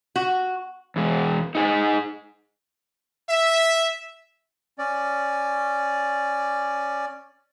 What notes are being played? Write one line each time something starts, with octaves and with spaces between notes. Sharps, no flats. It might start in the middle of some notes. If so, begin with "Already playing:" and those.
F#4
E2 G#3
D#4 G#4
E5
C#4 D5